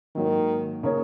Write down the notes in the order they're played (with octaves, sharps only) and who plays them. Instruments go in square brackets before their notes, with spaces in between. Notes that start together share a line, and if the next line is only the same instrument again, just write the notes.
[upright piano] G#2 F#3 A#3 [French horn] D#3
[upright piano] C#3 A#3 D#4 A#4 C#5